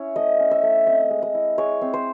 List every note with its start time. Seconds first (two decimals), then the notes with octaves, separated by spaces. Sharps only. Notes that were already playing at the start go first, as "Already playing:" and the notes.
Already playing: C#4 E4 C#5
0.16 A3 D#5
0.39 C#4
0.51 E5
0.63 A3
0.87 C4 D#5
1.10 G#3
1.23 D#5
1.34 E4
1.58 G#3 C#5
1.81 C4
1.94 C5